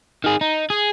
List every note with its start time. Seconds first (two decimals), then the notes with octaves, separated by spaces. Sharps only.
0.24 D#3 G#4
0.41 D#4
0.70 G#4